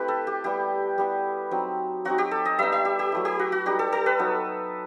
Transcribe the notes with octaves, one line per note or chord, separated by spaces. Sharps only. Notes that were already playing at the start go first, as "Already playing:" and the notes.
Already playing: A3 C4 E4 G4 B4
A4
G4
G3 B3 E4 G4
G3 B3 E4
F#3 C4 D#4
F#3 C4 D#4 F#4
G4
A4
D#5
G3 B3 D#4 E5
E5
G4
G4
F#3 A3 E4
G4
F#4
F#4
G3 D#4 G4
A4
A4
B4
F#3 B3 D#4